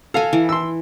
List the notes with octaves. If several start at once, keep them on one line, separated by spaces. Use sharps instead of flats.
A4 F5 G#5 A#5
E3
C6 E6